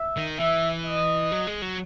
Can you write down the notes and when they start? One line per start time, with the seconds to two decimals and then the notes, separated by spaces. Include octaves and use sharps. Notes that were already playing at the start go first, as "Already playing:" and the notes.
Already playing: E5
0.17 D#3
0.40 E3 E5
0.85 D#5
1.32 F#3
1.47 G#3
1.62 F#3